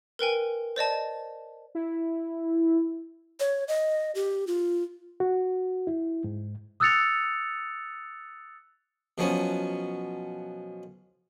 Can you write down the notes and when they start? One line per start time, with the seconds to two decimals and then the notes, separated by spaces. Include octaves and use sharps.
0.19 A#4 B4 G5 G#5
0.76 C5 D5 D#5 A5
1.75 E4
3.40 C#5
3.68 D#5
4.15 G4
4.47 F4
5.20 F#4
5.87 E4
6.24 G#2
6.80 D#6 E6 F#6 A6 C#7 F7
9.18 B2 F3 F#3 B3 C#4